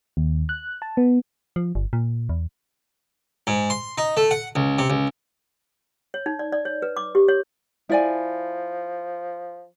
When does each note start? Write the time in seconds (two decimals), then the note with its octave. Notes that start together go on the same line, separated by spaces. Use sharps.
0.17 D#2
0.49 F#6
0.82 A5
0.97 B3
1.56 F3
1.75 G1
1.93 A#2
2.29 E2
3.47 G#2
3.70 C6
3.98 D#4
4.17 A3
4.31 F#5
4.56 C#2
4.79 C3
4.90 C#2
6.14 C#5
6.26 D#4
6.39 D5
6.52 D5
6.65 C#5
6.82 B4
6.96 D6
7.15 G4
7.28 C#5
7.90 F3 E4 D5 G#5